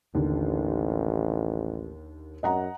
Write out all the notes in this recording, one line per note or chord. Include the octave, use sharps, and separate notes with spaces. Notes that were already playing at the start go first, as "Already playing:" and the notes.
A1 D#2 D3
F#2 D#5 F#5 A#5